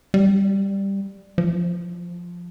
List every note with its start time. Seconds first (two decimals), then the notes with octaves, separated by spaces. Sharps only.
0.14 G3
1.38 F3